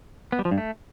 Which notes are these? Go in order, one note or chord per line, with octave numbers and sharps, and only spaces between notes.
B3
G3
F3
G2
A3